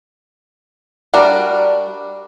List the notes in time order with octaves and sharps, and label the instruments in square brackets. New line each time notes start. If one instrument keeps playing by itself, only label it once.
[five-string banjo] G3 D4 F#4 A#4